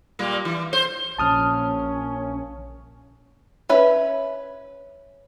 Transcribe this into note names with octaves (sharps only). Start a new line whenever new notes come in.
A#2 G3 A#3
E3
C5
A#1 A#2 F3 A#3 C#4 A5 D#6 F6
C#4 B4 E5